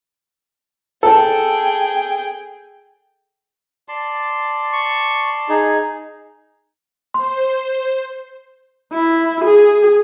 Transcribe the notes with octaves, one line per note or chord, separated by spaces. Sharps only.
G#4 A4 G5
D5 A5 C6
C#6
D#4 G#4
C5 C6
E4
G#4